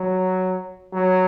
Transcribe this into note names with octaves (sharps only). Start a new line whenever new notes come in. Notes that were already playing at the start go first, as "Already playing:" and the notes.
Already playing: F#3
F#3